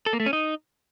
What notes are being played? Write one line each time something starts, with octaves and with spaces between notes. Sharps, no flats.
A4
A#3
A3
C#4
D#4